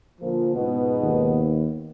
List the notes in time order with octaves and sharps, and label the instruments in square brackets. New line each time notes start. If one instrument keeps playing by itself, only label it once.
[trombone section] A#2 D3 F3
[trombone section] C#2 G#2 B2 [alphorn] B3
[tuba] D#2